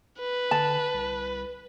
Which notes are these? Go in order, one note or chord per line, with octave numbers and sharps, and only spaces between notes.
B4
D3 A5
C2